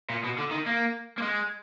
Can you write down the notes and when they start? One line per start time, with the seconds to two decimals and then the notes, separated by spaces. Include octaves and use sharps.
0.10 A#2
0.24 B2
0.38 D3
0.51 D#3
0.66 A#3
1.18 A#3
1.22 G#3